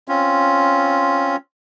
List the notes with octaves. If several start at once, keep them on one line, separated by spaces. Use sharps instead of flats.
C4 C#4 F4